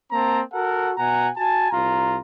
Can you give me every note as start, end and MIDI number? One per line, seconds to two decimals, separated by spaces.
0.12 0.41 58
0.12 0.41 60
0.12 0.41 81
0.12 0.41 82
0.53 0.92 66
0.53 0.92 69
0.53 0.92 70
0.53 0.92 78
0.97 1.28 47
0.97 1.28 78
0.97 1.28 80
0.97 1.28 82
1.36 1.70 66
1.36 1.70 80
1.36 1.70 81
1.71 2.18 36
1.71 2.18 65
1.71 2.18 82